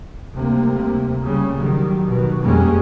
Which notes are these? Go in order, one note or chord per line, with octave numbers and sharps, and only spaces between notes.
D2 C3 G3 A#3
C#3 G3
D#3 F#3 G3
B2 D#3
F2 G3 G#3 A#3 C#4